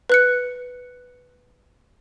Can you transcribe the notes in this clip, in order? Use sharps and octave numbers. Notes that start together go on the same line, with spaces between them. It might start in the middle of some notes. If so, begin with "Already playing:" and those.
B4 F#6 C#7